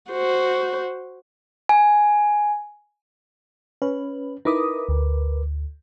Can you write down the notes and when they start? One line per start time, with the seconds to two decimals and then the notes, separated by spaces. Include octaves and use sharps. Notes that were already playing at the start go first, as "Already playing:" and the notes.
0.10 F#4 C5
1.69 G#5
3.82 C#4 B4
4.45 D#4 E4 A#4 B4 D6 D#6
4.89 D2